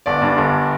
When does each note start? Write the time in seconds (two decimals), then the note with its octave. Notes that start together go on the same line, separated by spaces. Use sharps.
0.06 G1 D5
0.22 G2
0.38 G1